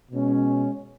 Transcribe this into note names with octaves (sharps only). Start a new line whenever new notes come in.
B2 G#3 C#4